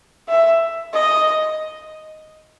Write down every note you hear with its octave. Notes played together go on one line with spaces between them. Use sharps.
E5
D#5